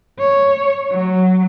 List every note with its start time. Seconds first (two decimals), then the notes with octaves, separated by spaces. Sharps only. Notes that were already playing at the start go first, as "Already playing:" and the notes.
0.19 C#5
0.92 F#3